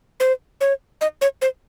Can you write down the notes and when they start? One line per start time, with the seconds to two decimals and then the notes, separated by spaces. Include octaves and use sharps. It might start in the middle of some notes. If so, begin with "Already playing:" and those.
0.20 C5
0.61 C#5
1.01 D#5
1.21 C#5
1.42 C5